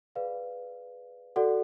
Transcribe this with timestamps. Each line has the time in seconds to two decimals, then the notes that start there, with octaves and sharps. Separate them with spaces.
0.15 G#4 B4 D5 F5
1.36 F#4 A4 D5 F#5